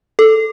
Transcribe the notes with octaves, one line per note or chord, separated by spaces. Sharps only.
A4